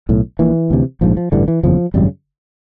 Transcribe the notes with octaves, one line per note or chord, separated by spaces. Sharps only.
B1 A2
A#1 A#2 E3
D2 C3
A#1 G#2 F3
F3
A1 G2 D3 E3
E3
F#1 E2 C#3 F3
G#1 F#2 C#3 G3